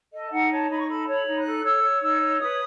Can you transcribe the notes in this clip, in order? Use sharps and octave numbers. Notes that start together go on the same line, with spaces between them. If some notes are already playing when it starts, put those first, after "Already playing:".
A4 D#5
D#4 F#5
C#5 A5
D#4 B5
C#6
A4 B5
C#5
B5
D#4
F#6
A4
C#5 E6
C#5
D#4 E6
C#5
B4 D#6